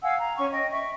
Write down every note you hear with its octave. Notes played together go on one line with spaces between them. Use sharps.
F5 F#5 G#5 E6
A#5
C#4 C#5 C#6
D#5 G5
E5 G5 C#6